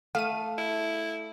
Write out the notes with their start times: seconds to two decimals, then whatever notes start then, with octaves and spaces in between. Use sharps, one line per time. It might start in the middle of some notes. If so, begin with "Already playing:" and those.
0.15 A3 A4 F5 D#7
0.58 E4